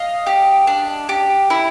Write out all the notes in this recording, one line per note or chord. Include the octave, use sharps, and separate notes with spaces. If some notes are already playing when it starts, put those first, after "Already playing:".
Already playing: D#5 F5
G4
D4
G4
E4